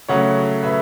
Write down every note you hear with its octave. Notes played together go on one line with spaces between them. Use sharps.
C#3 F#3 A3 C#5 F#5
B4 E5